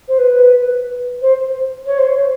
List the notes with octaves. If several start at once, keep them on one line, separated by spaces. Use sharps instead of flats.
C5
B4
C5
C#5
C5